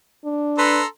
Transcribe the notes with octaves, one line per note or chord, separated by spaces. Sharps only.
D4
A4 B4 A#5 C6